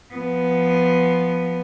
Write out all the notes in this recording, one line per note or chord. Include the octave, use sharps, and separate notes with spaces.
F3 B3